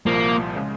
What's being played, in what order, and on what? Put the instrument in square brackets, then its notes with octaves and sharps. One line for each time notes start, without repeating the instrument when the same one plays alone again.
[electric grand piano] C2 A#2 F3 [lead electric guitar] A#3
[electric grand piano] C#3 G#3